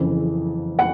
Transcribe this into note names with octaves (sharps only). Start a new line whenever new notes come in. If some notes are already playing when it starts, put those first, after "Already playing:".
Already playing: F#1 F2 C#3 E3
F#5